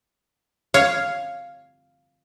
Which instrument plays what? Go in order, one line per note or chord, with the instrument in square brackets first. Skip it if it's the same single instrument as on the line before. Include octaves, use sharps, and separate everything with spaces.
[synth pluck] C#5 G#6 [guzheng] F5